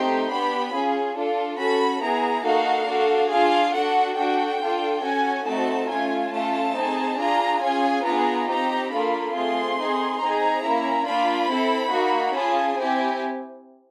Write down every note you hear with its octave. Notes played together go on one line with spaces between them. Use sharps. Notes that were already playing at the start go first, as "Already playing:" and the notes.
Already playing: A3 C4 D#4 G4 C6
B3 D4 G4 B5
C#4 F4 G#4
D4 F4 A4
C#4 F#4 A4 B5
B3 E4 G#4 A#5
A#3 D#4 F#4 A4 F5
D4 F#4 A4
D4 F4 G#4 F5
D4 F#4 A4 F#5
D4 F#4 A4 G5
D4 F4 A4
C#4 F#4 A4 G#5
A3 C4 D#4 F#4 A4 A5
A3 C#4 F4 G#5
A3 C#4 F4 A4 A5
C4 D#4 G#4
D4 F4 G#4 A#5
C#4 F4 G#4 G#5
B3 D4 F4 G#4 A#5
C4 D#4 G4 A#5
A#3 D4 F4 A4 B5
A3 C4 F4 G#4 C6
C4 D#4 G#4
C4 D#4 G#4 A#5
A#3 C#4 E4
A#3 D4 F4 B5
C4 E4 A4
A#3 D#4 F#4
C#4 F4 G#4 A5
C4 E4 G4 G#5